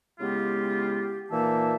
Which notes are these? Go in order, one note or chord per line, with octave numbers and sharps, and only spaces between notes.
C#3 G#3 B3 E4 F4 G4
A#2 E3 A#3 D#4 E5 A5